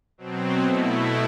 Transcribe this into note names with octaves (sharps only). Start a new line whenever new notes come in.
B2 F#3 C4
B2 A3 E4